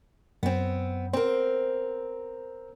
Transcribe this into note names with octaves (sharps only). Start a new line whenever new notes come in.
F#2 B3 C4
C4 A#4 C5